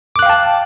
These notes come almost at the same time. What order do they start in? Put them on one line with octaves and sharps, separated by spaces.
D6 F#6 F5 G5 A5